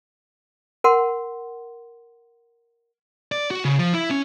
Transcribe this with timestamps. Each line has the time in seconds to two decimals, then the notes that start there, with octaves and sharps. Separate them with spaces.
0.84 A#4 F#5 C6
3.32 D5
3.51 F#4
3.65 C#3
3.79 F3
3.94 E4
4.11 C#4